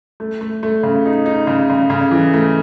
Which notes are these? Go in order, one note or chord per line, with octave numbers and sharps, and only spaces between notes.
A3
A3
A3
C#3
D#4
D#4
C#3
C#3
C#3
E3
A3